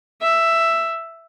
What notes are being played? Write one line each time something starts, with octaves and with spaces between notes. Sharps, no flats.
E5